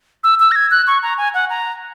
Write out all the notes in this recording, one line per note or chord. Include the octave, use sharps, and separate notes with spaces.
E6
E6
A#6
G#6
F#6
C#6
A#5
G#5
F#5
A#5